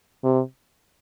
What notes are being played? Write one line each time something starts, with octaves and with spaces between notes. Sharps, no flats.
C3